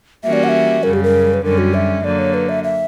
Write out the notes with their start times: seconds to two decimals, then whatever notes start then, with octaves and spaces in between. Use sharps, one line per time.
0.24 E3 G3 A#3 C#4 F#4 E5
0.33 D5
0.44 F#5
0.49 E5
0.83 F#2 C#3 G3 A#4
0.93 G4
1.03 A#4
1.34 B4
1.43 F#2 D3 G3 C#4 A#4
1.58 F#4
1.74 E5
2.04 D3 F#3 A#3 D5
2.19 C#5
2.34 B4
2.49 E5
2.64 E5